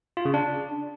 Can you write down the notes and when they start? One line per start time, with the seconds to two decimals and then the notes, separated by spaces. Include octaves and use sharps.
0.17 F4
0.25 C#3
0.34 D4